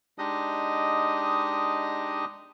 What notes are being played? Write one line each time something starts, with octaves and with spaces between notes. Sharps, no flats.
G#3 D4 D#4 G4 D#5 D#6